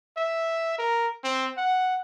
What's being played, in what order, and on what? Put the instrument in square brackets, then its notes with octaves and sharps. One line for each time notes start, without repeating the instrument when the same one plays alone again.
[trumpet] E5
A#4
C4
F#5